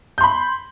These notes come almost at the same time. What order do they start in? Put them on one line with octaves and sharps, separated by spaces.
G6 C6 B5